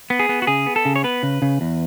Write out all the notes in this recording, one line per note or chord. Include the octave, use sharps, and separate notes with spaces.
B3
G#4
B3
F#4
C#3 G#4
B3
A4
C#3
C#5
B3 B4
C#3
C#3
E2